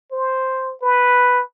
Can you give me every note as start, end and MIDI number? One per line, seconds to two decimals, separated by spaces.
0.12 0.73 72
0.82 1.42 71